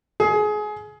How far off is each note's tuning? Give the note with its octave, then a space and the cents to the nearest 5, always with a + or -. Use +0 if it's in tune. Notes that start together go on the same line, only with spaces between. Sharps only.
G#4 +25